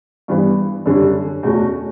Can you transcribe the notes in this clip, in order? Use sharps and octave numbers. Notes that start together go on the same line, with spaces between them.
G2 E3 B3
F#2 D3 G3 C#4
E2 B2 A3 C#4 F#4